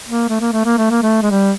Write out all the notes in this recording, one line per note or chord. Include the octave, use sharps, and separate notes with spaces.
A#3
A3
A#3
A3
A#3
A3
A#3
A3
G#3
G3